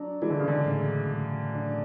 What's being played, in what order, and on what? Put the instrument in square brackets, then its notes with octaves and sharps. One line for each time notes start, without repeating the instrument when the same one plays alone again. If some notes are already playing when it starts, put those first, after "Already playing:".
Already playing: [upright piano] F#3 [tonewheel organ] D4
[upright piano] E3 [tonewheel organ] G#3
[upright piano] D3
C#3
D3
[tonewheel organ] A2
A2
D4